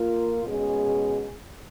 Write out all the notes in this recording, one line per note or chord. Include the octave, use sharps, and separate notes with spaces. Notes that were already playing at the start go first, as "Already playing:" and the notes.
Already playing: A#3 F4 A#4
B2 G#3 C#4 G#4